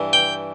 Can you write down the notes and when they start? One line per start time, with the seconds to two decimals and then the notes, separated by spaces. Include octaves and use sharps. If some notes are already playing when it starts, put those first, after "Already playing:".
Already playing: G2 E3
0.13 G5